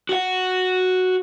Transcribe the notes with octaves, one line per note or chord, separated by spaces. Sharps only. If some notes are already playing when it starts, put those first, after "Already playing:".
F#4 F#5